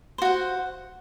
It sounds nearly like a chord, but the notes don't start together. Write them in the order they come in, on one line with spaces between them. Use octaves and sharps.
C5 F#4 F#5